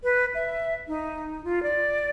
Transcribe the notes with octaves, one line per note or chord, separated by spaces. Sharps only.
B4
E5
D#4
F4
D5